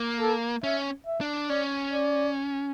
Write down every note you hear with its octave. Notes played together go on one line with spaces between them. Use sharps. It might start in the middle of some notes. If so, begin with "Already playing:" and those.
Already playing: A#3
A4
C#4 E5
E5
D4
C#4 D5
D5